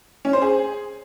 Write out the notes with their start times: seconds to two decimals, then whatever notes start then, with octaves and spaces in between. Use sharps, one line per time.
0.25 C#4
0.33 C5
0.42 G#4